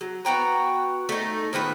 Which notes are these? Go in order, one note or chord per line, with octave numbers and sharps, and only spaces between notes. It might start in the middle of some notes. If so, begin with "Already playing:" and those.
F#3
B3 F#4 G5 A#5
A3 D#4
A#2 D#3 B3 B4